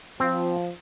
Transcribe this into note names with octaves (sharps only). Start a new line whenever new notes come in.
F3 C4